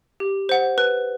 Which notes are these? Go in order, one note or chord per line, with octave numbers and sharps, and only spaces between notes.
G4
C5 F#5
B4